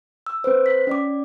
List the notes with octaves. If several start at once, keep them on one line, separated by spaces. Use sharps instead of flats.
E6
C4 B4 C5
B6
C#4 D5 D6